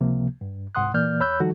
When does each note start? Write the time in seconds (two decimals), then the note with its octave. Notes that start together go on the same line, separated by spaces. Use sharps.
0.01 C#2 C3 F3 A#3
0.41 G2
0.75 C2 G#2 F#5 C6 D#6 F#6
0.94 A#2 E3 A#3 D5 F6 G6
1.20 E2 C#5 B5 E6 F#6 G6
1.40 D#3 F3 G3 D#4 F#4 A4